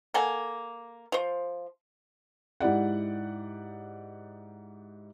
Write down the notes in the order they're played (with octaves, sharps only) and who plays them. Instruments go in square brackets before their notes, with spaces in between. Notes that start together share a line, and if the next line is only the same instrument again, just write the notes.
[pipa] A#3 A4 F#5 G#5
F3 C5
[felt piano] G#2 E4 G4 D5 F#5